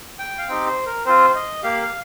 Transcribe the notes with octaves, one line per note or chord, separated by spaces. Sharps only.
G5
F5
C4 D#4 G4 G5
C5
A#4
C4 F4 C5
D#5
A#3 G4 F5
F5